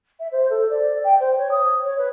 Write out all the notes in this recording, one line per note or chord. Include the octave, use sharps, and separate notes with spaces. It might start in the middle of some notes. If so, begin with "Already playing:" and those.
E5
C5
A4
D5
G5
C5
C#5
D#6
C#5
B4